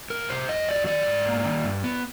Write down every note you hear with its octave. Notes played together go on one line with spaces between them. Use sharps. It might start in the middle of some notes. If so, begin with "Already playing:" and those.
A2 A#4
C3 C5
F2 D#5
F#3 D5
D#3 D5
G#2
A#3
D#3
G2
B3